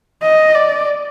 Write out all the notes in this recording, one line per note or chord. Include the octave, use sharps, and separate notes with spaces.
D#5
D5